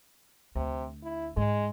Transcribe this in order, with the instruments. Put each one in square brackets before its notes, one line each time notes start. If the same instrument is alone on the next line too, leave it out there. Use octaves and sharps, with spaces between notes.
[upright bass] D2 [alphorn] C3
[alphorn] E4
[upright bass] G#2 [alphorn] G#3